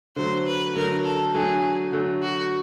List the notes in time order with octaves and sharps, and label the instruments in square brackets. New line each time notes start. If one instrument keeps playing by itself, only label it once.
[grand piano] D3 F#3 A3 [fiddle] C5
[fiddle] B4
[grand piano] D3 F#3 A3 [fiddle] A#4
[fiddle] A4
[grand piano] D3 F#3 A3 [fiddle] G#4
[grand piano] D3 F#3 A3
[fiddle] F#4